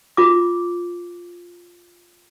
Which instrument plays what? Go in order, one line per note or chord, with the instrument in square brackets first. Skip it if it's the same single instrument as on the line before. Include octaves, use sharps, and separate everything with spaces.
[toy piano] F4 D6